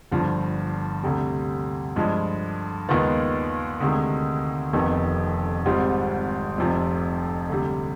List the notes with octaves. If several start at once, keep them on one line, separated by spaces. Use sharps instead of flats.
G1 G2 F3
D2 C3 G3
G2 F3 G#3
D#2 D#3 G#3 B3 F4
D2 C3 D#3 G#3
F1 F2 C3 D#3 B3
G#1 G#2 G3 C4 F4
F1 F2 C3 F3
D2 C3 G3